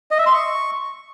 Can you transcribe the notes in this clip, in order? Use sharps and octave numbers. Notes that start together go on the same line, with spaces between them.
D#5
E5
C6
C#6